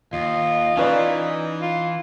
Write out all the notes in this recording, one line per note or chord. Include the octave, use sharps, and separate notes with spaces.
D#2 F4 D#5
E3 C#4 D#4 B4 D5
F4